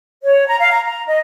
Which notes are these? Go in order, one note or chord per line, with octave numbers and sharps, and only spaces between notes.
C#5
A#5
F5
A#5
A#5
D#5